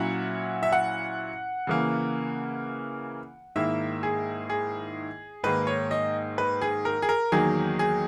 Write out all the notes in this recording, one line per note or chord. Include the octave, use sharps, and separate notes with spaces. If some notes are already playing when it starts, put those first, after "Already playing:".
Already playing: A#2 F#3 C#4 E4 F#5
E5
F#5
C#3 E3 A#3
G#2 D#3 A#3 E4 E5
G#4
G#4
G#2 D#3 A#3 B4
C#5
D#5
B4
G#4
A#4
G#4
A#4
E2 D#3 F#3 A#3 G#4
G#4